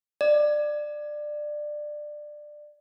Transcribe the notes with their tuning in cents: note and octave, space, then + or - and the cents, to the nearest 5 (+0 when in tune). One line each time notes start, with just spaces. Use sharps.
D5 +20